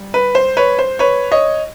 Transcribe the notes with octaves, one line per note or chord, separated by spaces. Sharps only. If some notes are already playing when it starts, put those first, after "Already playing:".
Already playing: G3
B4
C5
B4 C#5
C5
B4 C#5
C#5 D#5